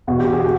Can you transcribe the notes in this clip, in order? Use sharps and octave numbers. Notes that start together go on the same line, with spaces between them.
E2 B2 F#4
G4
G#4
F#4